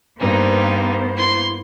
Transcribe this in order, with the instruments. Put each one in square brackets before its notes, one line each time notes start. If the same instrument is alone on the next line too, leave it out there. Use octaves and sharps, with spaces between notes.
[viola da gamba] G2 [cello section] A#3 B3 C5 [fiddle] D#4 [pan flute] B4
[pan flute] E4 [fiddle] C6